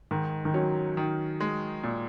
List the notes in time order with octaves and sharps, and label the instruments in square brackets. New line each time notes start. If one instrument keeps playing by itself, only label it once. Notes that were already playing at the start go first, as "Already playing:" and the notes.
[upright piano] G#2 [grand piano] D#3
[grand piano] D#3
[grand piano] F#3 [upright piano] C#4
[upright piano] D#3
G#3
A#2